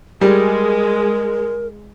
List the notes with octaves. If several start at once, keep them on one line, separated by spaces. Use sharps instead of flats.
G3 G#3 A#4